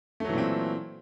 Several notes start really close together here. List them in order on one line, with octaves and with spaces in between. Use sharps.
A3 F#3 E3 A#2 C4